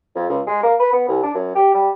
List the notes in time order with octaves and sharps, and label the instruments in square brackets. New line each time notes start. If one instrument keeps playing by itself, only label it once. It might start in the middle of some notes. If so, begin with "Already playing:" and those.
[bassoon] F2
C#2
G#3
A#3
B4
B3
C2
D4
F#2
G4
G3